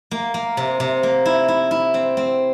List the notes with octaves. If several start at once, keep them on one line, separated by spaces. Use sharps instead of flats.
A#3
A#3
C3
C3
A#3
E4
E4
E4
C4
C4